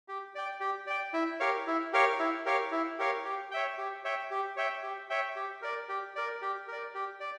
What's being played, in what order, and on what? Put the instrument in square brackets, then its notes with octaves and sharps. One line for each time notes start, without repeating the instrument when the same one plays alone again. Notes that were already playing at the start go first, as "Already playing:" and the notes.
[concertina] G4
D5 G5
G4
D5 G5
E4
G4 A#4 C#5 F5
E4
G4 A#4 C#5 F5
E4
G4 A#4 C#5 F5
E4
G4 A#4 C#5 F5
G4
C#5 E5 G5
G4
C#5 E5 G5
G4
C#5 E5 G5
G4
C#5 E5 G5
G4
A#4 D5
G4
A#4 D5
G4
A#4 D5
G4
D5